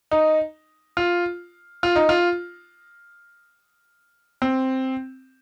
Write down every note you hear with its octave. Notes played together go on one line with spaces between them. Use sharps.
D#4
F4
F4
D#4
F4
C4